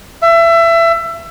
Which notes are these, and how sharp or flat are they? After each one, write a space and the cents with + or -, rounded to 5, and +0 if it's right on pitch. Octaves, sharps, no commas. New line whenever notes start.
E5 +25